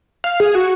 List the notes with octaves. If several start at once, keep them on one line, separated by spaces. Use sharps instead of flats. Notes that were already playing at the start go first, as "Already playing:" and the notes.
F5
G#4
F#4